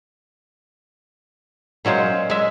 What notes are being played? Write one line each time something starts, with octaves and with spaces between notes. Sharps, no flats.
A#2 F#3 G#3 C#4 C5
G#3 E5